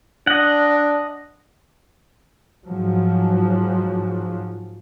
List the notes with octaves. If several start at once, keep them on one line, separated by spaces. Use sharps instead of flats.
D4 D#5 F#5
G#2 F3 F#3